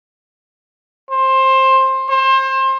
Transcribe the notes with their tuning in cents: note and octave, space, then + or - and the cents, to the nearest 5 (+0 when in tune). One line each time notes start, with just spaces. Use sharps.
C5 +20
C5 +30